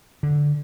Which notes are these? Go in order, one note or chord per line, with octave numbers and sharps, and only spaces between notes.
D3